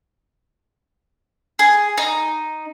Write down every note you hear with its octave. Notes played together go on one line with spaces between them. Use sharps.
G#4
D#4